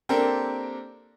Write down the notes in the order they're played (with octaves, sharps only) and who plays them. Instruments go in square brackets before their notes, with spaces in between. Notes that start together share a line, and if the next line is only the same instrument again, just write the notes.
[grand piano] A#3 C4 D4 G4 A4 A#4